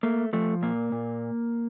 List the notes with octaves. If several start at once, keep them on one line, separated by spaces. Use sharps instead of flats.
A3 A#3
F3 A3
A#2 A#3
A#2